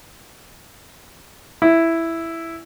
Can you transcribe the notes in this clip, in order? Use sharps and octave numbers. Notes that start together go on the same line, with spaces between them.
E4